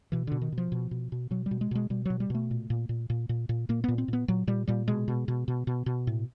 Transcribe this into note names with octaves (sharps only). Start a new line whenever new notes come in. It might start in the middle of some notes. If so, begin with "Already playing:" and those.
B2 E3
B2 D3
D#3
B2
F3
B2
B2
B2
B2 F#3
G3
B2
G#3
B2 G#3
B2 G3
B2 F#3
G3
B2 A3
A#2
A#2
A#2
A#2
A#2
A#2
A#2 A#3
A#2 B3
C4
A#2 B3
A#2 F#3
A#2 G3
A#2 G3
B2 G#3
B2
B2
B2
B2
B2
A2